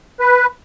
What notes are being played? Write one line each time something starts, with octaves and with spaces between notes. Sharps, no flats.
B4